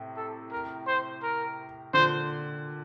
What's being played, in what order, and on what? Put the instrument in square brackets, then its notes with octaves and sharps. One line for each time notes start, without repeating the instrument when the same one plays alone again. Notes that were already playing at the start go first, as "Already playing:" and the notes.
Already playing: [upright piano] A2 C3
[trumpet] A4
A#4
C5
A#4
[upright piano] A#2 D3 [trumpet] C5